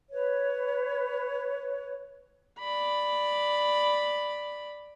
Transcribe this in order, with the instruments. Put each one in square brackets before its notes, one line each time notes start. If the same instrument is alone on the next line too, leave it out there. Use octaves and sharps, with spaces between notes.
[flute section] B4 C#5
[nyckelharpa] D5 B5